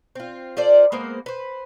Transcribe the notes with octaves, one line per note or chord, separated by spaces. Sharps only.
C4 F4
F4 A4 C5 D5
G#3 A#3 B3 C5
B4 C5